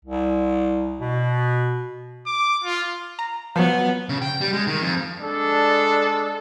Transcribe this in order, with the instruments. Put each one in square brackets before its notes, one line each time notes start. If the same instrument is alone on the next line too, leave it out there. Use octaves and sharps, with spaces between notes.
[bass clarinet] C2
B2
[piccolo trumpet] D6
F4
[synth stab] A#5
[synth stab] F3 F#3 [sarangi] B3
[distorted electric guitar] C#3
G5
G3
G#3
D#3
F2
[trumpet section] G#3 D4 A4